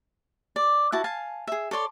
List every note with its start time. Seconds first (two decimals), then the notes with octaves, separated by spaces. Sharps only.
0.56 D5
0.92 E4 F#4 A5
1.04 F5 G#5 A5
1.47 G#4 E5
1.71 A4 C#5 D5 C6